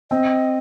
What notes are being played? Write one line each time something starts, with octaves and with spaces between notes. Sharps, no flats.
C4 D#5